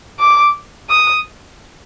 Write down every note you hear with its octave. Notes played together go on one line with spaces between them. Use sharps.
D6
D#6